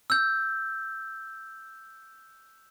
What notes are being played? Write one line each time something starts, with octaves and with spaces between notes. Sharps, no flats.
E6 G6